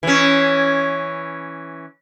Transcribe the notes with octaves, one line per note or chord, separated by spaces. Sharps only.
E3 C#4